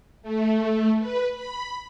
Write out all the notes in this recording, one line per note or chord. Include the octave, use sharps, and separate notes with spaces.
A3
B4
B5